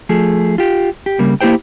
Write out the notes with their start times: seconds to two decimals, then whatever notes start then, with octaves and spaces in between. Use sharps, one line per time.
0.09 F3 A3 G#4
0.58 F4 G4
1.06 G4
1.19 C#3 G3 A#3
1.41 A#3 E4 G4 C5 G5